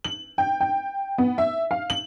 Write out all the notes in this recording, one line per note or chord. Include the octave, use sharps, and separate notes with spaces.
F#7
G5
G5
B3
E5
F5
F#7